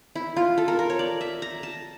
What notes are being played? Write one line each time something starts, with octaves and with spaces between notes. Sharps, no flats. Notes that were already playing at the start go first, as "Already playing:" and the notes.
E4
F4
A4
A#4
A#4
C#5
D5
E5
A#5
A5